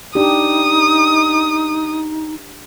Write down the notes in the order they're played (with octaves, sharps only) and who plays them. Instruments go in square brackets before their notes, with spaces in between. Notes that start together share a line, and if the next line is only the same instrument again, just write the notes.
[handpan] D4 G4 [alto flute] D#4 [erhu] D#6